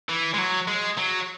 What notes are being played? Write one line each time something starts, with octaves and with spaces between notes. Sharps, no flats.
E3
G#3
F#3
G#3
F#3